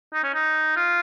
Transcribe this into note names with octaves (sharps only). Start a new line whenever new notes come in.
D#4
C#4
D#4
F4